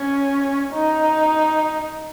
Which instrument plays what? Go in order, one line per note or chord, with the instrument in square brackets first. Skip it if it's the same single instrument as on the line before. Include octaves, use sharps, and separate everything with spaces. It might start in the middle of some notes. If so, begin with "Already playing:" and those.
Already playing: [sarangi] C#4
D#4